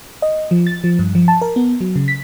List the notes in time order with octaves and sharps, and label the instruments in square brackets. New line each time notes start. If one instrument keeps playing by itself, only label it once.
[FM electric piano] D#5
F3
A6
F3
G2
F3
A5
A#4
B3
F#3
C#3
B6